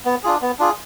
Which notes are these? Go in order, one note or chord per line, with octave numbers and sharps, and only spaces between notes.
B3
D4 F4 G#4
B3
D4 F4 G#4